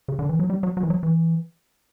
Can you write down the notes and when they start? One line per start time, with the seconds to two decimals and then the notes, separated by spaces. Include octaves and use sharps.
0.08 C#3
0.19 D3
0.29 E3
0.39 F#3
0.50 G3
0.63 F#3
0.77 F#3
0.83 E3
0.90 F#3
1.03 E3